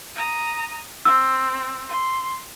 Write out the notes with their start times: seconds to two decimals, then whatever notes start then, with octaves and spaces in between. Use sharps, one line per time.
0.16 A#5 D#6
1.05 C4 E6
1.89 C6